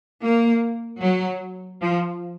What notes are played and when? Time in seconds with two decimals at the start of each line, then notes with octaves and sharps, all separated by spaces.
0.22 A#3
1.02 F#3
1.81 F3